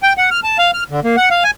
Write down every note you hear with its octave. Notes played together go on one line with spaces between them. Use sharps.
G5
F#5
F6
A5
F5
F6
D3
A#3
F#5
F5
G#5